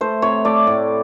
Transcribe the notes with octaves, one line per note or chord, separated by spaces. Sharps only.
A3 C5
C3 C#5
A3 D5
A2